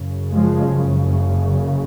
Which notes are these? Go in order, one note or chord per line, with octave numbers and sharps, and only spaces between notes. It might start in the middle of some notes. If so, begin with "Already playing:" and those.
Already playing: F#1 F#2 C#3
F3 G#3